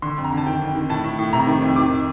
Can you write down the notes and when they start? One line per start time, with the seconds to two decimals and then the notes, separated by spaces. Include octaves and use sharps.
0.02 D3 C6
0.17 F2
0.24 A#5
0.32 D3 A5
0.47 D#3 G5
0.61 F2
0.75 D#3
0.90 A2 A5
1.04 A2
1.19 A2
1.33 C3 A#5
1.47 D#3
1.62 F2
1.76 D#3 D6